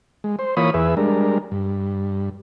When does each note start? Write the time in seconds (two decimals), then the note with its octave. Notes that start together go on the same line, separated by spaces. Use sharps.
0.24 G#3
0.39 C5
0.57 E3 A#3 F4 C#5 B5 D#6
0.74 E2 G#4 B4 E5
0.97 G3 G#3 D4 A#4
1.52 G2